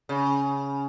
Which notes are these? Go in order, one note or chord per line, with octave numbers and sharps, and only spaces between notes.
C#3